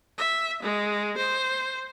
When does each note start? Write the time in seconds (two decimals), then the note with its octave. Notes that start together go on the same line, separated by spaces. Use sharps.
0.18 E5
0.62 G#3
1.17 C5